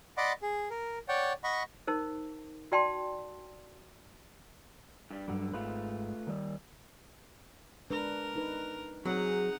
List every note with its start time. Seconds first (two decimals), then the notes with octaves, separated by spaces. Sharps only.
0.17 D5 D#5 F#5 B5 C6 D6
0.42 G#4
0.70 A#4
1.08 C#5 D5 F#5 G5
1.44 D#5 F#5 B5 C#6
1.87 D#4 A#4 C5
2.72 F#4 D5 G5 A5 C6
5.11 G2 G3
5.28 G2 D3 F#3 G3
5.54 G#1 G#2 A3 F4 B4
6.27 D#3 G3
7.91 G#3 D4 A#4 B4
8.36 D#4 B4
9.06 F#3 C4 D#4 G#4 F#5